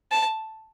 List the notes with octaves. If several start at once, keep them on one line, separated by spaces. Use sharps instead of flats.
A5